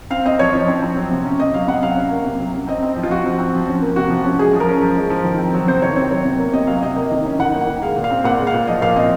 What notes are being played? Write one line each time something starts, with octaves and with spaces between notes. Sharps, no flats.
C4 F5
C4 D#5
F3 C#5
F3
C4
C4
F#3
C3
C#4
C3 D#5
F#3 F5
C3 F#5
F#3 F5
C#4
A#3
C3
F#3
C#4
C4 D#5
C4
F3
F4
F3 F#4
C4
C4
F3
C#4
A#3
C3 F#4
F3
C#4
G#3 G#4
F3
A#4
C#4
F3
G#3
F3
D#3
C4
F#3
C3 C5
D#3 C#5
C4 C#5
F#3 C#5
C3
A#3
C3 D#5
F#3 F5
C3 D#5
A#3 D#5
D#3
C#4
D#3 F#5
A#3
D#3
G#3 F5
A#2
F5
C4
A#2 F#5
G#3
F5
A#2
F3 D#5
A#2 F5
C4 D#5